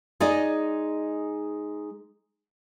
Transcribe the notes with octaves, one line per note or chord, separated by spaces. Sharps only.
G#3 D#4 G#4 D5 D#5